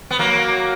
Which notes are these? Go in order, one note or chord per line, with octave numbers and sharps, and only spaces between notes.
B3
F#3 A#3